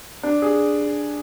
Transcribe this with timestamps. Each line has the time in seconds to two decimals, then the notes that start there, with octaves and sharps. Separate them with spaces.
0.23 D4
0.42 G#4